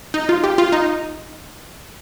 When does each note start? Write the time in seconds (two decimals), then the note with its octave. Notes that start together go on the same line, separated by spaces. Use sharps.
0.14 D#4
0.29 F4
0.44 G4
0.58 F4
0.73 D#4